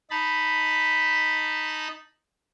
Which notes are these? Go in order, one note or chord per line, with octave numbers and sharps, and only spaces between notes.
D#4 A5 B5